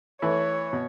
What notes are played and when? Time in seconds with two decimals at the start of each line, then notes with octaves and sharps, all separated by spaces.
0.21 E3 A3 E4 C#5
0.73 B2